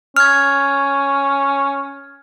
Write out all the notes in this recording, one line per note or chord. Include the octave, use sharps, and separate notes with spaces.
C#4 F6 G#6